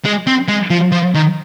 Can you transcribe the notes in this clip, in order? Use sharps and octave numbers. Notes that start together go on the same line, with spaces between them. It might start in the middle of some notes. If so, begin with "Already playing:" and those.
G#3
C4
G#3
F3
F3
D#3